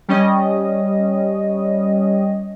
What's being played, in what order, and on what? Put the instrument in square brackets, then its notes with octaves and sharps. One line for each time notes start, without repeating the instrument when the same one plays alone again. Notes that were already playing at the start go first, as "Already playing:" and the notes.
[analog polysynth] G3 C#4 D#5